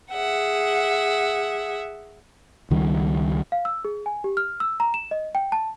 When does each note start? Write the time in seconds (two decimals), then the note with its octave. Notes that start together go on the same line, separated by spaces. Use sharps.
0.12 G#4 E5 F#5
2.71 C#2 D#3 G3
3.52 F5
3.65 E6
3.85 G#4
4.06 G#5
4.24 G4
4.37 F6
4.60 E6
4.80 A#5
4.94 E7
5.11 D#5
5.35 G5
5.52 A5